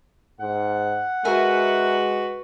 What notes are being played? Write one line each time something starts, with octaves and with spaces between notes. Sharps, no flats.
G#2 F#5
G#3 F#4 A#4 B4 E5 G#5